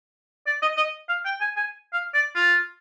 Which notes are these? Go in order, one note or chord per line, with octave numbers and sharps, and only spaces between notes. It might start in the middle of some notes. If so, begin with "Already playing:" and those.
D5
D#5
D#5
F5
G5
G#5
G#5
F5
D5
F4